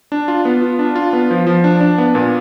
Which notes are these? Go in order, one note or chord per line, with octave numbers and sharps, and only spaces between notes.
D4
F4
B3
F4
D4
F4
B3
F3
F3
D4
D4
B3
A#2